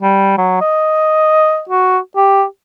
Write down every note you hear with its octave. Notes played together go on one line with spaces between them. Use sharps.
G3
F#3
D#5
F#4
G4